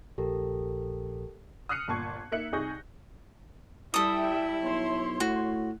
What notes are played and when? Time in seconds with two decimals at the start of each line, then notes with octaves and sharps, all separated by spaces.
0.18 A#1 G4 A4 A#4
1.69 D#6 F6 F#6 C7 C#7 D#7
1.88 G1 A#2 A5 C#6 G#6
2.32 A#3 D#4 E5 F#6 C#7 F#7
2.53 C2 D#4 G#4 C#6 G6 A#6
3.94 G3 E4 A4 E5 G5 D#6
4.62 B1 C#5 C6
5.20 A2 F#4